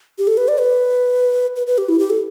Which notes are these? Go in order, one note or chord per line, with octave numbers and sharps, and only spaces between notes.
G4
A4
B4
D5
B4
B4
B4
G4
E4
G4
A4